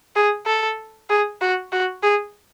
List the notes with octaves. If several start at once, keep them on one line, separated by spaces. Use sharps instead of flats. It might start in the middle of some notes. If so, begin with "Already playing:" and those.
G#4
A4
G#4
F#4
F#4
G#4